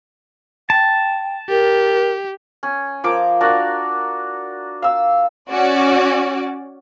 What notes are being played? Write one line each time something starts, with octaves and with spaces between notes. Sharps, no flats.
G5 A5
G4 A#4
C#4
F3 A#4 D6
D4 F#4 A#4 D5
F5 E6
C#4 F#4 D5